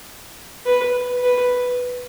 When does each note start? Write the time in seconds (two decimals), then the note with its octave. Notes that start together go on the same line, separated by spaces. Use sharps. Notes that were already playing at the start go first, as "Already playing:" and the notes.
0.66 B4
1.23 B4